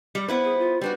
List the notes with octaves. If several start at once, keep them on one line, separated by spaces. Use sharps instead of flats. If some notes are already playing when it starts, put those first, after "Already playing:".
G3
B3 E4 B4 C5
G#4
F4
G3 D4 F#4 B4